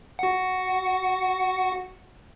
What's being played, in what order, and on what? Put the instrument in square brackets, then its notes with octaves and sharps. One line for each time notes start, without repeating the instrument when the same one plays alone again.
[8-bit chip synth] F#4 F#5